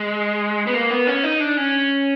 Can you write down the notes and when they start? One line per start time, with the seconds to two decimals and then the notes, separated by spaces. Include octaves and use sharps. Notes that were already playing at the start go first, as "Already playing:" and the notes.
Already playing: G#3
0.67 B3
0.74 A#3
0.91 B3
1.07 C#4
1.24 D#4
1.40 D4
1.57 C#4